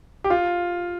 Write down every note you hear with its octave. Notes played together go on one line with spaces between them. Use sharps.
G4
F4